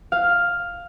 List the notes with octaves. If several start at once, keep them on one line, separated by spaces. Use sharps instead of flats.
F5